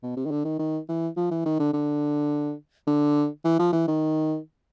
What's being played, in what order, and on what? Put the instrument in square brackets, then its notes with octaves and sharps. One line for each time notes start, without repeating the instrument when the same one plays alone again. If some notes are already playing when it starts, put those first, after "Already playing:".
[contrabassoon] B2
C3
D#3
D3
D#3
D#3
E3
F3
E3
D#3
D3
D3
D3
E3
F3
E3
D#3